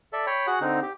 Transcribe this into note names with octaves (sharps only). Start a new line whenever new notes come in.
A4 D5 E5
C#5 G5 B5
F#4 G#4 F#5
D3 C4 D#4
G4